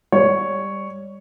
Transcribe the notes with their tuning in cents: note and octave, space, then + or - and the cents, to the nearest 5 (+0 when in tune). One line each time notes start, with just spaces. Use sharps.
G3 +15 C#5 +0